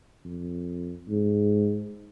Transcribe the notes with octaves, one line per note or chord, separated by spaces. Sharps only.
F2
G#2